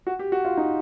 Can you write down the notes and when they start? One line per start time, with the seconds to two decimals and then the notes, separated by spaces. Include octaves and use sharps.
0.07 F#4
0.19 G4
0.32 F#4
0.45 F4
0.57 D#4